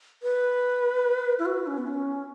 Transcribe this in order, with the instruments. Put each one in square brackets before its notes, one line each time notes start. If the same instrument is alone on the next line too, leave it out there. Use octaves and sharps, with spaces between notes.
[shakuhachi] B4
E4
F#4
C#4
B3
C#4